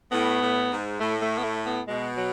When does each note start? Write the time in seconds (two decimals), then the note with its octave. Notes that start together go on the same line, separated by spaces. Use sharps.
0.12 A2 B3
0.41 A2
0.71 G#2
1.00 A2 A3
1.22 A3
1.38 B3
1.44 A3
1.66 B3
1.88 B2 G#3
2.17 F#3